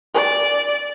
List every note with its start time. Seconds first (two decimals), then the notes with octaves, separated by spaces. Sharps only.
0.14 D5